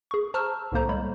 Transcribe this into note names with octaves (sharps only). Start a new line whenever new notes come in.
G#4 C#6
C5 A5 A#5 C#6 E6 F6
C2 A2 D3 A#3 C5 A#5
G3 G#3 C#5 B5